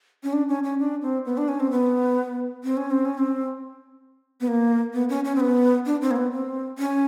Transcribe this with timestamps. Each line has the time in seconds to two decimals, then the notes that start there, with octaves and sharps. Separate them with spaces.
0.24 C#4
0.33 D4
0.49 C#4
0.64 C#4
0.79 D4
1.02 C4
1.25 B3
1.37 D4
1.48 C#4
1.60 C4
1.71 B3
2.64 C4
2.77 C#4
2.91 C4
3.05 C#4
3.18 C4
4.41 B3
4.48 A#3
4.93 B3
5.09 C#4
5.25 C#4
5.36 C4
5.40 B3
5.86 D4
6.02 C4
6.11 A#3
6.16 B3
6.32 C4
6.78 C#4